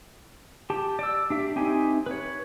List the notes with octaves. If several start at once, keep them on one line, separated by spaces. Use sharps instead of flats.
G4 A5
D5 E6
D4 G4 E5
C4 D#4 G4 E5 G#5
B4 C#5